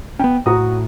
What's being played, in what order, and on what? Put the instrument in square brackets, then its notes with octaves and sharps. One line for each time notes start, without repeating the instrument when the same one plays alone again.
[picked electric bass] B3 C#4 [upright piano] G5
[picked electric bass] A2 [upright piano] F#4 A#5 D#6